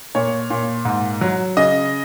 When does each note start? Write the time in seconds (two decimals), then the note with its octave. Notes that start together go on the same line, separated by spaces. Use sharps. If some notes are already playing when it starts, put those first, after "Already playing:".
0.15 A#2 C#5
0.50 A#2
0.85 G#2
1.21 F#3
1.57 C#3 D#5